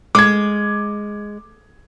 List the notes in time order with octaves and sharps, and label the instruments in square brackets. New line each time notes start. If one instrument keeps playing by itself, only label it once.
[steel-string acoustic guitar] G#3 [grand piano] D6 G#6